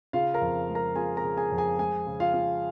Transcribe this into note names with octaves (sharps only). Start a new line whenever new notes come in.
C#3 F4 F5
A#4 A#5
F2
G#3
A#4 A#5
F4 G#4 G#5
A#4 A#5
C#3
G#4 G#5
F2
G#4 G#5
G#3 G#4 G#5
C#3
F4 F5
F4